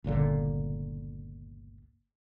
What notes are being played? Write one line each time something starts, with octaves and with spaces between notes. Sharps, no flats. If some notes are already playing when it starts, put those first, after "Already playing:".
G1 C#2 A#2 D3